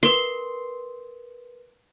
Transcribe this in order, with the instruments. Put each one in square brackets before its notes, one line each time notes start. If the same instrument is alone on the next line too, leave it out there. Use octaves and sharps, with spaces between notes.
[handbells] A#4 B4 [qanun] C6